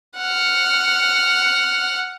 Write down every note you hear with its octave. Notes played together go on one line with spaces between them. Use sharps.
F#5 F6